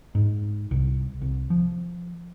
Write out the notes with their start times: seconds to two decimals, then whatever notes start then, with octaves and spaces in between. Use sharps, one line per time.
0.15 G#2
0.71 C2
1.21 C2
1.50 F3